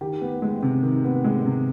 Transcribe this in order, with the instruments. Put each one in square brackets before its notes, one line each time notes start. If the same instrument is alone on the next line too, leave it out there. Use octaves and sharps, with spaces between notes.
[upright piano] D#3 G4
B3
G#3
C3
D#3
B3
G#3
C3